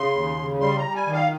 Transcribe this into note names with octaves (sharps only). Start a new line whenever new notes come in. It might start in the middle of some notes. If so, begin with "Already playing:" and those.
Already playing: C#3 C6
D#2
C#3
G3 C6
A#5
G3
G#5
D#3
F5